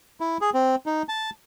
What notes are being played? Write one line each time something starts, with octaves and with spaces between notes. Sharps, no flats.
E4
G#4
C4
D#4
A5